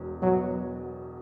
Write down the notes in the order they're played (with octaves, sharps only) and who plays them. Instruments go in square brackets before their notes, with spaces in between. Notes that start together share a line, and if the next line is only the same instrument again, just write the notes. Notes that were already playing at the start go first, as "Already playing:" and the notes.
Already playing: [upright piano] E1 E2 B2
[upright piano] B2 [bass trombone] F#3